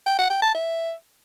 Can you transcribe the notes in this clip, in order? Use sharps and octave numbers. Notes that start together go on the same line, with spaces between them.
G5
F#5
G5
A5
E5